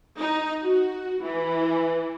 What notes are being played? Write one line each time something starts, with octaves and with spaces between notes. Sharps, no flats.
D#4
F#4
E3